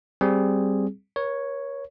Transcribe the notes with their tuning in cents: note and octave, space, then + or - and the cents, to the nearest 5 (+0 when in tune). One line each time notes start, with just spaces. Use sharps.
G3 +0 C4 +0 G#4 +0
A#4 +40 C#5 +0